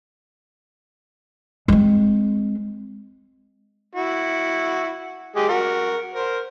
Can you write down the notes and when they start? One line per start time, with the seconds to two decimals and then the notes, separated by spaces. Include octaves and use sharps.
1.68 G#3 C4
3.95 E4 F#4
5.36 G#3 G4 G#4
5.49 F#4 A#4
6.14 A#4 C5